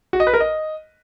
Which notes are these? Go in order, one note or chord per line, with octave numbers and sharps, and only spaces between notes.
F#4
D#5
B4
A#4
D#5